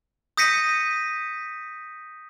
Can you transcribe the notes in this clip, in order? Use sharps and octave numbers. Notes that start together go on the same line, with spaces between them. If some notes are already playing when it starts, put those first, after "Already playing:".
D#6 G6 A#6 B6 C#7 D#7